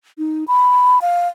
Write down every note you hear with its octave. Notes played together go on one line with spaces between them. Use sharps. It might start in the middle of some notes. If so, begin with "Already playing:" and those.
D#4
B5
F5